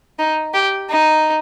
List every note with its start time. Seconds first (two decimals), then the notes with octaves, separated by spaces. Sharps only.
0.19 D#4
0.54 G4
0.90 D#4